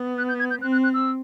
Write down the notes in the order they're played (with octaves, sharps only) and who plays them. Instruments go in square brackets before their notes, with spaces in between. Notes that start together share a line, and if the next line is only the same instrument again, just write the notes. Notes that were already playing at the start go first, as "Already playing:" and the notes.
Already playing: [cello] B3
[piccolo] F#6
G6
G#6
G6
[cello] C4 [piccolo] F#6
[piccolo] F#6
F#6
E6